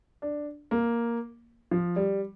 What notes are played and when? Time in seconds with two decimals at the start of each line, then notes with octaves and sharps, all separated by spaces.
0.22 D4
0.71 A#3
1.71 F3
1.96 G3